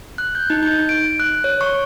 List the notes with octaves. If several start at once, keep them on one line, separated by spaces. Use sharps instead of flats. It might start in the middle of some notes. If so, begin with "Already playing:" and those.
F#6
G6
D#4
G6
D7
F#6
C#5
C#6